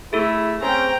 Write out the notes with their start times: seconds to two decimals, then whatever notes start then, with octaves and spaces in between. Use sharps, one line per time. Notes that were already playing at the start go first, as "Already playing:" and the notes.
0.13 A3 E4 G#4 A4
0.61 C4 C#4 G5 A#5